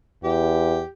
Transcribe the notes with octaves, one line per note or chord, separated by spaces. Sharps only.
E2 G4